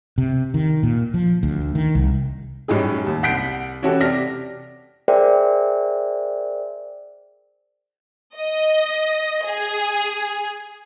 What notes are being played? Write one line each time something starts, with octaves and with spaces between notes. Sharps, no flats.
C3
D#3
A#2
F3
D2
D#3
C2
F#2 A2 G3 D#4 G#4
D#2
C2 F#5 G6 B6 C7 D7
E3 C#4 F#4 G4 A4
C3 D5 F6 A#6 B6
G#4 A#4 C5 D5 E5 G5
D#5
G#4